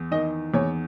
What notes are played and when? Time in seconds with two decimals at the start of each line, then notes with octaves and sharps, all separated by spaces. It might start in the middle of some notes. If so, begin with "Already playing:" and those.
Already playing: E2
0.11 D#3 D#5
0.54 E2 C#5